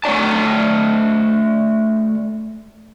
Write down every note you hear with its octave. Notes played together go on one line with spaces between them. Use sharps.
A3 C#5 D5 A5